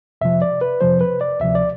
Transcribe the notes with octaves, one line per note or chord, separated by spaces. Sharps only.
F2 C3 F3 E5
D5
B4
F2 C3 F3 C5
B4
D5
D2 C3 F3 E5
D5